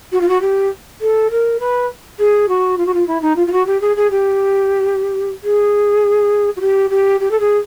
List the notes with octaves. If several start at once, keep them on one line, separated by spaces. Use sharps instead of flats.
F#4
F4
F#4
G4
A4
A#4
B4
G#4
F#4
F4
F#4
F4
E4
D#4
F4
F4
F#4
G4
G#4
G#4
G4
G#4
F#4
G4
G4
G4
A4
G#4